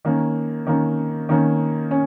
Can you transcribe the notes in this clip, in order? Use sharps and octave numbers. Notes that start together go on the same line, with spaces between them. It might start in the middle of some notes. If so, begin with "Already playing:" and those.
D#3 A#3 C#4
D#3 A#3 C#4
D#3 A#3 C#4
C#4